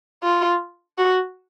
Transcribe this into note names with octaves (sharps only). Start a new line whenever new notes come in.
F4
F#4